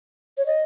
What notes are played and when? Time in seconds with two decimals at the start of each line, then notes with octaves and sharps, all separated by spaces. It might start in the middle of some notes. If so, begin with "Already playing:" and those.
0.38 C#5
0.46 D#5